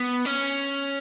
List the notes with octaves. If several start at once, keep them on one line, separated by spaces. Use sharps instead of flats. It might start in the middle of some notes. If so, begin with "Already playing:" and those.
Already playing: B3
C#4